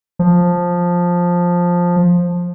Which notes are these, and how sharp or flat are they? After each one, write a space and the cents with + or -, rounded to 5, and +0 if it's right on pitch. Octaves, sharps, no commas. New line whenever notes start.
F3 +10